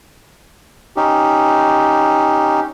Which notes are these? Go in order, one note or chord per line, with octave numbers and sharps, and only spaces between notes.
C#4 D#4 G4